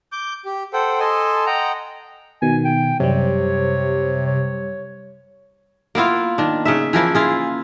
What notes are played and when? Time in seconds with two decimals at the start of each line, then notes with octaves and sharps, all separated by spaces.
0.12 D6 G6
0.45 G4
0.73 A4 C5 F#5 G5
1.00 A4 D#5 G#5 A5 C6
1.46 D#5 F#5 G5 A#5
2.42 B2 D#3 G#5
2.64 G5
3.00 F#2 C3 G3 C#5
4.26 C#5
5.95 A#3 B3 E4 F4
6.38 D#3 D4
6.65 C#3 D#4 E5
6.93 E3 F3 A#3 E4
7.15 E4 F4 G#4